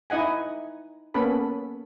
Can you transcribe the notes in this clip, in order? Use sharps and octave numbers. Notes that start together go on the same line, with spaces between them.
D#4 E4 D#5 F#5 G#5
A#3 B3 C#4 A4 B5